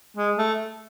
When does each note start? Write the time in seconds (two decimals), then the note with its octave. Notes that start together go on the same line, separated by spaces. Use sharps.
0.17 G#3
0.38 A3